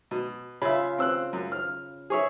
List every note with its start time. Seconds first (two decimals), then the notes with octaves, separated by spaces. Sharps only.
0.11 B2
0.62 C#3 F4 E5 B5
0.98 C4 E6 F#6
1.33 F#2
1.52 F6
2.10 G#4 C#5 E5